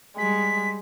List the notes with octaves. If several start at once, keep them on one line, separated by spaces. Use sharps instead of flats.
G3 G#3 B6